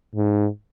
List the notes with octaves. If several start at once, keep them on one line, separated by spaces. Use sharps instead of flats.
G#2